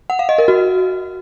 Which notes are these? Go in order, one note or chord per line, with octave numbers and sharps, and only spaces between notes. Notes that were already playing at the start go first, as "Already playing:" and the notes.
F#5
F5
D#5
A#4
F#4